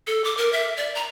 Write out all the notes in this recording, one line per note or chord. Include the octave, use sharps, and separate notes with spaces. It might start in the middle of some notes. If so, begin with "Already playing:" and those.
A4
D6
A#4
E5
D5
A#5